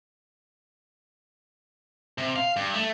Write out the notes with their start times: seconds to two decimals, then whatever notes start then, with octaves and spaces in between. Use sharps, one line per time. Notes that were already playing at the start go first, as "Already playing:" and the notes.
2.18 C3
2.36 F5
2.56 G2
2.74 A3